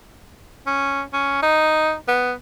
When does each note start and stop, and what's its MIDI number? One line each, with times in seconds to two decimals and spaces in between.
0.67 1.02 61
1.13 1.41 61
1.43 1.94 63
2.08 2.33 59